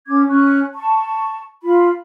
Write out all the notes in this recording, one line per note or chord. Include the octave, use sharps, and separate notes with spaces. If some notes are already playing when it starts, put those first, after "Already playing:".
C#4 D6 G#6
C#4 C#6 F#6
A5 C#6
F4 B5